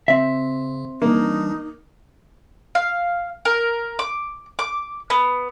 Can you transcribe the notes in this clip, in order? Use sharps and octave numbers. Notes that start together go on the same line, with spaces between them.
C#3 C4 E5
E3 G3 A#3 D4 D#4
F5
A#4
D6
D6
B3